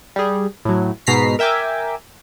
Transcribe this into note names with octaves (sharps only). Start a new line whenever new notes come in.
G3 G#4
A2 F#3
G#2 B2 A#5 B6 C7
A#4 E5 G5 G#5 D6